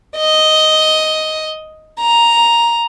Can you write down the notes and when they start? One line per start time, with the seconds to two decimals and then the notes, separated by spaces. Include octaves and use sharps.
0.17 D#5
2.00 A#5